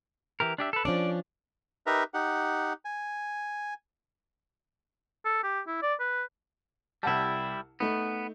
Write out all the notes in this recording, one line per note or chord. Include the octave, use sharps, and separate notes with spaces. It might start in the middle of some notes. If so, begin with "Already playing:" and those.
E3 G4 A#4
D4 G4 E5
A4 B4
F3 C#4 D4 D5
D#4 G4 A#4 B4 E5 A#5
D#4 G4 F#5
G#5
A4
G4
E4
D5
B4
C2 G3 E4 F#5 A5
A3 B3 D#4